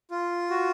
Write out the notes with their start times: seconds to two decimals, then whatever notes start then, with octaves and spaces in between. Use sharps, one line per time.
0.11 F4
0.50 F#4